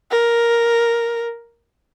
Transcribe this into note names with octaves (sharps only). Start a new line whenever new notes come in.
A#4